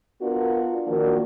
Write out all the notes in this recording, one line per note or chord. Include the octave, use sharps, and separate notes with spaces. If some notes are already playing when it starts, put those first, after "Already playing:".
B3 D4 F4 F#4 A#4
D#3 F3 A#3 D4 F#4 A#4